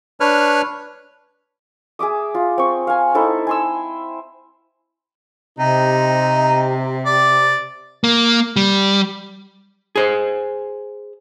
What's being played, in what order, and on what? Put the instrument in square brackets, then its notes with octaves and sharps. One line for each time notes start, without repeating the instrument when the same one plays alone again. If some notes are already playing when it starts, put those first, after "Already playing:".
[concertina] D4 B4 C#5 F6
[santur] G#4 E5 D6 D#6
F4
C4 C#6
F5 G#5
D#4 E4 A4 C5
G#5 C6 E6
[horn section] C3 [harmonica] D#4
[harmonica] D5
[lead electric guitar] A#3
G3
[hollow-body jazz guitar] G#4 C5